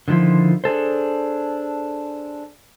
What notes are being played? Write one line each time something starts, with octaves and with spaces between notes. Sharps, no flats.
D3 D#3 F3 E4 F4
D4 G#4 A4 C5